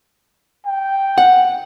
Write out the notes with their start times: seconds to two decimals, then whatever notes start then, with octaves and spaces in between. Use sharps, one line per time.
0.66 G5
1.18 F#5